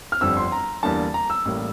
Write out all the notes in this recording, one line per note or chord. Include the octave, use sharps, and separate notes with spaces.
F6
G1 F2 D3 G3 E6
C6
A#5
E2 D3 G3 A#3 A5
A#5
E6
A1 A2 G3 A#3